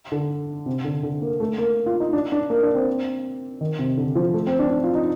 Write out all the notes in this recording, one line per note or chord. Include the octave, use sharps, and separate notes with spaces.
D3
C3
D3
D3
A#3
A3
A#3
F4
D#4
D4
D4
A#3
D4
C4
D#3
C3
D3
F3
A3
C4
D4
D4
F4
D#4